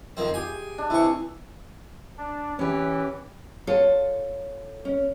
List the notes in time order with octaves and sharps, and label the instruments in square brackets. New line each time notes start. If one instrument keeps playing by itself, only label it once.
[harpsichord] F2 D#3 C4
[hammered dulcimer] G4 G#4 [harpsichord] G#5
[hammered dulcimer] D4
[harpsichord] C3 C#6 [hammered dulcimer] E3 E4
[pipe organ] D4
[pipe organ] E3 [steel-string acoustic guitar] C#4 G4
[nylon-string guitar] F4 A4 C#5
C#4